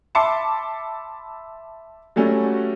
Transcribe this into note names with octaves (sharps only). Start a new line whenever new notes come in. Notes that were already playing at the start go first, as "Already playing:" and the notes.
E5 A5 B5 C6 D6 C#7
F#3 G3 A3 C#4 F#4